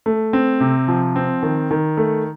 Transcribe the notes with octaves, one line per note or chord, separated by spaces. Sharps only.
A3
C4
C3
F3
C4
D#3
D#3
A3